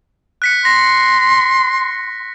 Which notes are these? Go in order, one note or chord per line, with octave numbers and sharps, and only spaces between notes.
F#6 B6 C#7
C6 A#6